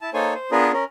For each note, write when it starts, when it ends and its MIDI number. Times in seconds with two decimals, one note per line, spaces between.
0.01 0.10 64
0.01 0.10 81
0.14 0.34 58
0.14 0.34 63
0.14 0.34 69
0.14 0.34 72
0.14 0.34 73
0.14 0.34 80
0.34 0.51 72
0.51 0.72 59
0.51 0.72 62
0.51 0.72 65
0.51 0.72 68
0.51 0.72 70
0.51 0.72 71
0.73 0.84 61
0.73 0.84 70